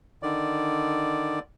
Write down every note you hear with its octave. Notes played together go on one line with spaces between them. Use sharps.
D3 D#3 D5